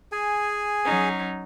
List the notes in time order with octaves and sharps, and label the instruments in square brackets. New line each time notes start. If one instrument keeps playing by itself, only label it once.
[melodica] G#4 G#5
[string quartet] F#3 C#4 D#4